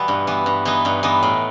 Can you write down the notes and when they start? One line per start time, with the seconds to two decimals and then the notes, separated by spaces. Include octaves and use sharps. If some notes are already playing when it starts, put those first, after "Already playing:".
Already playing: B2 E3 G3 B3 E4
0.08 G2
0.27 E3 B3
0.46 G2
0.65 E3 B3 D#4
0.85 G2
1.03 E3 B3 D#4
1.23 A2